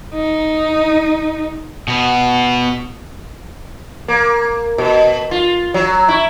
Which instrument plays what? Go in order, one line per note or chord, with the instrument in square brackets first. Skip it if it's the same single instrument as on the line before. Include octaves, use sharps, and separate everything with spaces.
[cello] D#4
[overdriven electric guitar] B2 B3
[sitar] A#3
B2
F4
F#3
E4